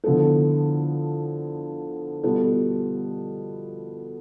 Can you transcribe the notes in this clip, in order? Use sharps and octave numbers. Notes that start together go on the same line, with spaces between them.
D3 F3 B3 E4 A4
B2 G3 B3 F4 A4